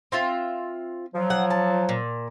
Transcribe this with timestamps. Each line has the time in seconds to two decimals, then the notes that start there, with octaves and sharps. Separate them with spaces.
0.12 C4 F4 E5
1.15 F3 F#3
1.30 F#5
1.50 A5
1.89 A#2